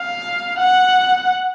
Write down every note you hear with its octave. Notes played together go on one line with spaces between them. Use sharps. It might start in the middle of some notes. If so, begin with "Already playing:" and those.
Already playing: F5
F#5